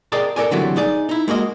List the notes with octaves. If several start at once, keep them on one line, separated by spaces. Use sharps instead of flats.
G#4 A#4 D5 D#5 G5 A5
A4 A#4 D5 G#5
D3 E3 F#3 G3 A3 C4
D#4 G#4 D5
D#4 E4
G#3 A#3 F#4 D#5